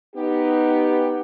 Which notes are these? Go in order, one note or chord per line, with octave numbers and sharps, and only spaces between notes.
B3 D#4 G4